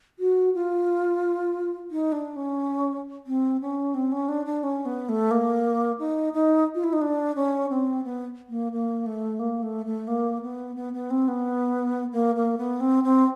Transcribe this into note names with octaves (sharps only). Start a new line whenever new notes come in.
F#4
F4
D#4
D4
C#4
C4
C#4
C4
C#4
D4
D4
C#4
B3
A3
A#3
D#4
D#4
F4
E4
D#4
D4
C#4
C4
B3
A#3
A#3
A3
A#3
A3
A3
A#3
B3
B3
B3
C4
B3
A#3
A#3
B3
C4
C4